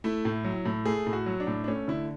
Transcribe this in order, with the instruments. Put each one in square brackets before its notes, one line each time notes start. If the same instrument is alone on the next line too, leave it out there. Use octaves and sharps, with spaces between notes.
[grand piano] A3 E4
A2
F#3
A2
A3 G#4
A2
F#4
F#3
D4
A2
D4
A3 C#4
D3 E4